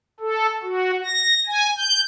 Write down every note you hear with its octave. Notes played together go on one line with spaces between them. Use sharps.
A4
F#4
A#6
G#5
G6